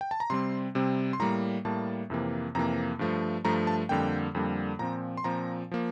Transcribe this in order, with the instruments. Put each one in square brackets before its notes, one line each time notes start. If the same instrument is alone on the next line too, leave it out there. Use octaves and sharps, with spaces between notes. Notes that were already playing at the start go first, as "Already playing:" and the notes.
[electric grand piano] G5
A5
A#5
C3 G3 C4 C6
C3 G3 C4
C6
A2 G3 A#3 A#5
A2 G3 A#3 A5
F2 C3 E3 A#3
F2 C3 E3 A#3 A#5
G2 F3 A3
G2 F3 A3 A#5
A5
F2 D3 G3 A#3 G5
F2 D3 G3 A#3
A#2 F3 C4 A#5
C6
A#2 F3 C4 A#5
F3 A#3